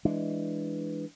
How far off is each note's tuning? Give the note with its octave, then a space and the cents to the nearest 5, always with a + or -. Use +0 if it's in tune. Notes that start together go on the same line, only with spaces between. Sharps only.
E3 +0 G#3 +0 D4 +0